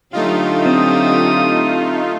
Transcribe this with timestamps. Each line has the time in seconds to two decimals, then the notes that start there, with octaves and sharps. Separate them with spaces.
0.13 D3 F#3 A3 D#4 F4 G4
0.66 C4 D#6